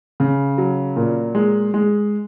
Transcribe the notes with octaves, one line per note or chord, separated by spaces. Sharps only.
C#3
F#3
A#2
G#3
G#3